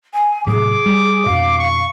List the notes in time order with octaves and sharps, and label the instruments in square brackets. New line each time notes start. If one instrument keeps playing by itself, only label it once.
[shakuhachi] G#5
[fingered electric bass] A2 C3 F#3 [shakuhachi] G#4 [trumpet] D6
[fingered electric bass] G3
[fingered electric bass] F2 B2 [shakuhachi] F5
[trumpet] C#6